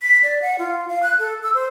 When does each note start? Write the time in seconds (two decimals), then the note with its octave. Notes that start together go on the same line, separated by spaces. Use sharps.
0.02 B6
0.23 D5
0.42 F#5
0.59 F4
0.89 F5
1.03 F#6
1.19 A4
1.43 E6
1.54 C5